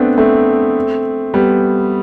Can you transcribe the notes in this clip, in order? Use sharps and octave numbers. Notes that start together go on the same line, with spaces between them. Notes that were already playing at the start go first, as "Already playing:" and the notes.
Already playing: A3 B3 C4 D4
A3 C4
G3 B3